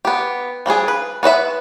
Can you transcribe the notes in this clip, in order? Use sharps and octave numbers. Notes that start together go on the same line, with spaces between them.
B3 G4
F3 G3 D4 G#4
B4
B3 B4 D#5 E5